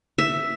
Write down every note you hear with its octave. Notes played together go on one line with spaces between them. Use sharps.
E5